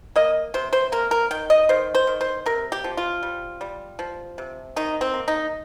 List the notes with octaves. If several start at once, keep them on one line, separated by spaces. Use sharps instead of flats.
A#3 D#5
C3 C5
C5
A#3 A#4
A#4
D#3 G5
D#5
D#3 C5
C5
D#3
C5
C3 A#4
G4
F3
F4
G3
G3
F3
C3
D#3 D#4
C4
A#3
D#4